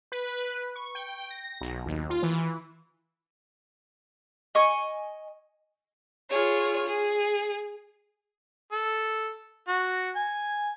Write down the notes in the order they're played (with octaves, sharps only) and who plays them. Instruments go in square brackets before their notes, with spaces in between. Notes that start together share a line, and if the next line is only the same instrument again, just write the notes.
[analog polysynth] B4
C#6
G5
A#6
B1
D#2
F4
E3
[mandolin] D#5 G#5 C#6
[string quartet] F4 G#4 C#5
G#4
[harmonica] A4
F#4
G#5